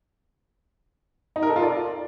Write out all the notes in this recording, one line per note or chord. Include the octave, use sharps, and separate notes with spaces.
D#4
A#4
A4
F4
D5